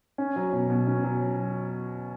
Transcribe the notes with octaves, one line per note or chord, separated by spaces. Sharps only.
C#4
F#3
B2
B2
C#4
F#3